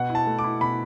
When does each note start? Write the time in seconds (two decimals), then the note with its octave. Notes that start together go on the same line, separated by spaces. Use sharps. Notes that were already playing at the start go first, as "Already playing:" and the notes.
Already playing: B2 F#5
0.09 E4
0.15 A5
0.27 A3
0.39 D6
0.44 E4
0.61 B2 B5